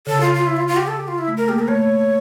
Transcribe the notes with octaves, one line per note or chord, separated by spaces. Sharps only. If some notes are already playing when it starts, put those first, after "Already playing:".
C#3 A4
F4
F4
E4
F4
F4
G4
A4
G4
F4
E4
A3
A#4
A#3 G4
A#4
A3 C#5